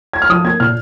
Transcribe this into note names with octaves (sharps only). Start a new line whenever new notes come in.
G#6
F6
F3 D#6
A#3 G#6
A#2 F6